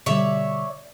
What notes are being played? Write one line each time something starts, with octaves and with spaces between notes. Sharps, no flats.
B2 D3 G3 C#5 D5 E5